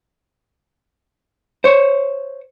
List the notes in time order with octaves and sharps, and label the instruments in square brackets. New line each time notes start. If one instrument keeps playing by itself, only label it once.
[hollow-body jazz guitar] C5 C#5